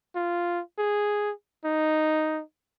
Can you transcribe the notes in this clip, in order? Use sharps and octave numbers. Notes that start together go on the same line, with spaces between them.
F4
G#4
D#4